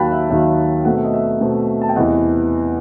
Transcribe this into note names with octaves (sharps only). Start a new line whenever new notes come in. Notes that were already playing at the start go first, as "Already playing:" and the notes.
Already playing: D#2 D#3 F#3 G5 A5 B5 F#6
E5
D#2 D#3 F#3 E5
B2 A3 C4 F#5
E5
D#5
E5
B2 A3 C4
A5
G5
E2 C3 E3 D#5 F#5